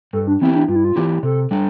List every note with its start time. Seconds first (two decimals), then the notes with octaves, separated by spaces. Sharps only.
0.13 G2 A4
0.27 D4
0.41 E3 B3 C4 E4 G4
0.55 D4
0.68 G2 F4
0.76 E4
0.85 F4
0.96 E3 B3 E4 G4
1.23 C3 A4
1.51 G3 D4 A4